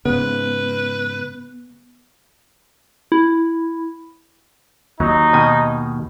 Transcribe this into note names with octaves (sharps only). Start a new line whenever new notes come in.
G#2 C#3 B3 B4
E4
D#2 F#3 D#4
B2 D#3 G#5